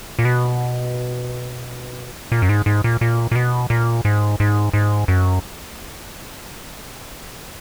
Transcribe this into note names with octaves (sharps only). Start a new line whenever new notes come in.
A#2
B2
A#2
F#2
G#2
G#2
A#2
A#2
A#2
B2
A#2
G#2
G#2
G#2
F#2